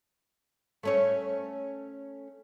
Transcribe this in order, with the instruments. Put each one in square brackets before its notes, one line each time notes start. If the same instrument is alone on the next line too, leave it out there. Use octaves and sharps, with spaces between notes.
[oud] A3 C#4 C#5